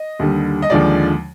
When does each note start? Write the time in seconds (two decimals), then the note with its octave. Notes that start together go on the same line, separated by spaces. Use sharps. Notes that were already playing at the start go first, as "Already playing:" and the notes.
Already playing: D#5
0.19 D#2 D3 G3
0.62 D#5
0.70 D#2 D3 F3 G#3 D5